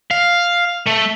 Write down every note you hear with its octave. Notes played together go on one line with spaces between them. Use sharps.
F5
A3